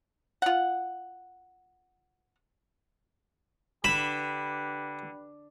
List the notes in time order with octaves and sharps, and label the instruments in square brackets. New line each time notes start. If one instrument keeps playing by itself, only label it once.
[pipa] F4 F#5
[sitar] D3 [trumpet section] G4 B4 [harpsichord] B5 [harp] E7